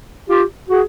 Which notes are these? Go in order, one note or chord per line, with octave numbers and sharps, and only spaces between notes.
F4 G4
F#4 G#4